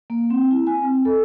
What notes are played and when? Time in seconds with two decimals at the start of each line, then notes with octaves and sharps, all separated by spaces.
0.10 A#3
0.30 C4
0.51 E4
0.67 G#5
0.83 C4
1.05 A4